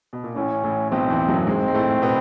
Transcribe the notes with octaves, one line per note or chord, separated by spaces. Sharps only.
B2
A#2
A1 A2 C#4
A1 A2
B1 B2 C4
E2 E3
F#2 F#3
G#2 G#3 C4
G#3
A2 A3
B2 B3